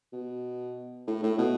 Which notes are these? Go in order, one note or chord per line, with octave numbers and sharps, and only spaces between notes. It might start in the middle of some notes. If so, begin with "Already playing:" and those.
B2
A2
A2
B2